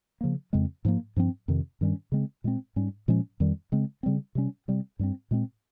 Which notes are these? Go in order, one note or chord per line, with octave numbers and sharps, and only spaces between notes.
C#3 F3 A#3
F2 C#3 G#3 C4
G#2 F3 A#3
G2 F3 C4
F2 C3 D#3
G2 D#3 G3 C#4
C#3 G#3 C4
A#2 G#3 C4
G#2 G3 C#4
A#2 F3 G#3 C#4
F2 D#3 G3
C#3 G#3 C4
C#3 G3 C4
C3 G3 C#4
C3 G3 C4
G2 G3 C4
A#2 G#3 C4